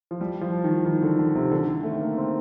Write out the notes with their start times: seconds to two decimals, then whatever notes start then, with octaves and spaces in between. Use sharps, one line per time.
0.11 F3
0.21 G3
0.41 F3
0.64 D#3
0.85 D#3
1.02 D3
1.19 D3
1.35 C3
1.51 D3
1.67 D#3
1.83 A3
2.01 A#3
2.17 C4